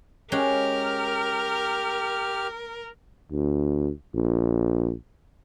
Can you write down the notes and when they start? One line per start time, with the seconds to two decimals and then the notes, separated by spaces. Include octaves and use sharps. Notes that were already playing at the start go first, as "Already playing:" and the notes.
0.32 G#3 C#4 G4 A#4 F#5 F6
3.32 D2
4.14 A#1